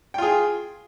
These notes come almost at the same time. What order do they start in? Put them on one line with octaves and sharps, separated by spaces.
G5 F4 G#4